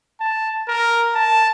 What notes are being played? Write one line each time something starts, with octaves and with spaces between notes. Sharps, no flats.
A5
A#4
A5